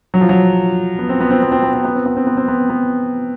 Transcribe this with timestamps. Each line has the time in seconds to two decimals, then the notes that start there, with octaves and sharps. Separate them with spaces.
0.14 F#3
0.21 F3
0.29 F#3
0.99 B3
1.09 C4
1.21 B3
1.30 C4
1.42 B3
1.52 C4
1.63 B3
1.73 C4
1.85 B3
1.95 C4
2.06 B3
2.17 C4
2.27 B3
2.37 C4
2.48 B3
2.70 B3